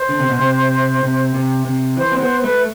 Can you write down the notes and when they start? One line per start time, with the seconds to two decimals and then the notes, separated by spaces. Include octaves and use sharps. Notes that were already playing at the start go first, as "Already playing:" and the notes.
Already playing: C5
0.09 D3
0.19 C3
0.29 B2
0.39 C3
1.03 C3
1.34 C3
1.65 C3
1.97 E3 C5
2.12 C4
2.20 B3 C5
2.43 A3 B4